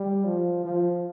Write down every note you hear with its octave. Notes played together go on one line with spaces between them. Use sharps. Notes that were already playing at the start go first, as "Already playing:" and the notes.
Already playing: G3
F3
F3